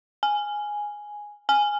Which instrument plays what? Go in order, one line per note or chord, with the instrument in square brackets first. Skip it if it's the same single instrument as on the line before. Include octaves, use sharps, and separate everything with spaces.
[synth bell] G#5
G#5